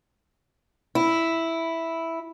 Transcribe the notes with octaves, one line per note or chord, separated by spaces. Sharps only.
E4